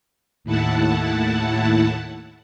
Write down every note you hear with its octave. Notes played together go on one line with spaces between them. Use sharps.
D#2 A2 E4 F#5 A5